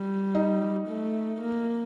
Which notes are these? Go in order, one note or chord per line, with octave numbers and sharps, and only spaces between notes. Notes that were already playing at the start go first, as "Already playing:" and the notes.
Already playing: G3
D#4
A3
A#3